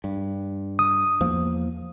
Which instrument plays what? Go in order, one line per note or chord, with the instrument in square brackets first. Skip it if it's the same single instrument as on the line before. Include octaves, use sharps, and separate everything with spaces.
[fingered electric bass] G2
[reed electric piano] D#6
[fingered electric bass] E2 F3 A#3